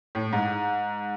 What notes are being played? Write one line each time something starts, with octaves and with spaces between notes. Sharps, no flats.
A2
G#2